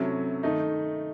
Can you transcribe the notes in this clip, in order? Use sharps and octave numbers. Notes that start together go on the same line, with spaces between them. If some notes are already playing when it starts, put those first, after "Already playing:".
Already playing: C3 F#3 A3 C#4 E4
D#3 A3 D#4